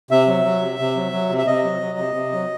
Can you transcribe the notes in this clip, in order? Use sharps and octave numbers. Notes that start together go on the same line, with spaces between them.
C3 E5
F#3
F#3
C3
C3
F#3
F#3
C3
E5
C3 D#5
F#3
F#3
C3
C3
F#3